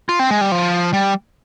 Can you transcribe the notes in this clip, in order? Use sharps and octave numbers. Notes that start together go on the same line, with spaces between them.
F4
C4
G#3
G3
F3
G3